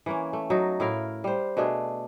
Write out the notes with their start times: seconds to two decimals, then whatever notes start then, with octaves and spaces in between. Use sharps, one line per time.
0.06 E3 A#3 C#4
0.33 A3
0.50 F#3 D#4
0.80 A2 E4 A#4 F5
1.24 G3 C5
1.57 B2 A3 D4 G#4